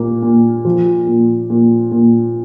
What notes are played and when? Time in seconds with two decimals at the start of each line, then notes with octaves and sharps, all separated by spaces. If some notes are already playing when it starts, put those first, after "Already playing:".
Already playing: A#2 A#3
0.22 A#2
0.65 F3
1.07 A#2
1.50 A#2
1.92 A#2